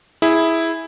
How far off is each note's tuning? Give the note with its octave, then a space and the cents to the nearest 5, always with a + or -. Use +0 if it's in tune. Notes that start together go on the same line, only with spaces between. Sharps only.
E4 -5 G#4 +0